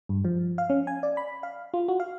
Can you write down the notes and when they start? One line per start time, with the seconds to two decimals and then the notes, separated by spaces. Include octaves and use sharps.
0.09 G2
0.25 F3
0.58 F5
0.70 C#4
0.87 G#5
1.03 D5
1.17 B5
1.43 F5
1.74 F4
1.88 F#4
2.00 F5